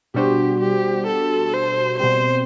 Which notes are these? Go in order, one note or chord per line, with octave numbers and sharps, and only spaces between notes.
B2 G3 D4 F#4 G4 C5
G4
A4
C5
B2 G3 C4 C5